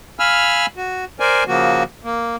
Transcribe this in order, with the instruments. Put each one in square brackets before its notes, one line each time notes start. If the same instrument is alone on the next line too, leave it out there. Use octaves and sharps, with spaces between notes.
[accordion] F5 G#5 B5 E6 F6
F#4
A#4 C5 D5 G#5
C#3 F3 A#3 F#4
A#3